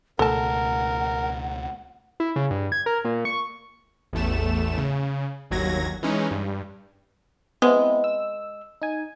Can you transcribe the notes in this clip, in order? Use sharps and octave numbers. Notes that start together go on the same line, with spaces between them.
C#2 B2 A3 A4 A#4 F#5 A5
E4
C#3
G2
G#6
A#4
A#2
C#6
A1 E2 A3 E7
C#3
G1 D#2 F#3 G#6 A#6
E3 G#3 C#4 D#4
G2
G#3 B3 C4 E4
E6
D#4 G#5